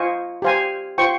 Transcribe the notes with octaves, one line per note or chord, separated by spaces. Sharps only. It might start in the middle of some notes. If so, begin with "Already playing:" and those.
Already playing: F4 C5 D#5 G#5 C#6
G4 C5 F5 G#5
F4 C5 G5 C#6